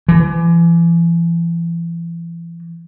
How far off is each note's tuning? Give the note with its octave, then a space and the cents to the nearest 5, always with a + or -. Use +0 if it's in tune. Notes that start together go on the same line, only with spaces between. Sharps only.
E3 +35